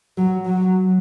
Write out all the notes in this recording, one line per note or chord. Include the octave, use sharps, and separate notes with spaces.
F#3
F#3